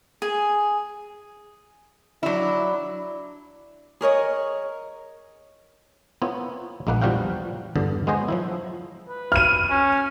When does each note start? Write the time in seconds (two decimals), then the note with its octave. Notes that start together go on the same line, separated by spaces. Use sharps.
0.22 G#4
2.23 F#3 D4 E4
4.01 G#4 A#4 C#5 D#5
6.22 B3 C4 E4 F4 A#4 C#5
6.87 A#1 G#3 A#3 B4 F#5
7.01 E2 F3 G3 F#4 F5 G5
7.76 E2 G2 D3
8.07 G#3 B3 F#4 G#4 C5 D#5
8.28 F3 F#3 E4
9.08 B4
9.32 F6 D#7
9.70 C#4